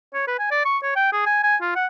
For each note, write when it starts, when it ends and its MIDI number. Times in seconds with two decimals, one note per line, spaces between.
0.14 0.24 73
0.27 0.38 71
0.39 0.47 80
0.51 0.65 74
0.65 0.78 85
0.83 0.93 73
0.96 1.11 79
1.13 1.23 68
1.26 1.42 80
1.44 1.56 80
1.61 1.73 65
1.76 1.86 78